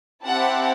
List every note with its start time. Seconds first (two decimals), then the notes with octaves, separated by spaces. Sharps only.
0.24 C4 E4 G4 F#5 A5